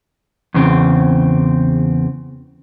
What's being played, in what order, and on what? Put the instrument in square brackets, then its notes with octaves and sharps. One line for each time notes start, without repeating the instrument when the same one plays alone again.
[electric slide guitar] E2 C#3 C4